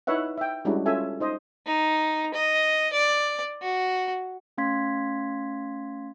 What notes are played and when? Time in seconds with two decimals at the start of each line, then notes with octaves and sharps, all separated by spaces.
0.07 D#4 E4 B4 C#5 E5 F#5
0.38 E5 G5
0.65 G3 G#3 C#4 D4 E4 F#4
0.86 C#4 F4 A4 E5 G#5
1.20 D#4 C5 D#5
1.66 D#4
2.34 D#5
2.93 D5
3.62 F#4
4.58 A3 C#4 F5 C6 G#6 B6